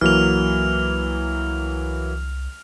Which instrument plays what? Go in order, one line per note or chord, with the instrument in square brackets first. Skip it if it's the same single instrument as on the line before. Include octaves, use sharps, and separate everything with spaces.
[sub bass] C2 [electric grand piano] E3 F#3 A#3 [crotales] F6 F7